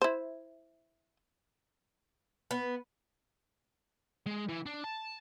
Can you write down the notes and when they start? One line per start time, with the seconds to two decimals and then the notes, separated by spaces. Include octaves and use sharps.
0.02 E4 C5
2.51 B3
4.26 G#3
4.49 E3
4.66 D4
4.84 A5